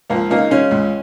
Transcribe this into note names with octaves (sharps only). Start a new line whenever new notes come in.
C#2 F3 A#3
C#3 A#3 D#4
C#3 G#3 C#4
C#2